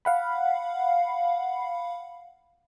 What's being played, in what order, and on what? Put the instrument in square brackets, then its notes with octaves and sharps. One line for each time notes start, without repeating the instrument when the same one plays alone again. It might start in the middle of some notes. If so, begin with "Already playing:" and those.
[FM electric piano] F5 F#5 B5